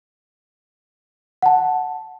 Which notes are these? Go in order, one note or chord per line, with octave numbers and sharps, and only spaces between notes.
F#5 A5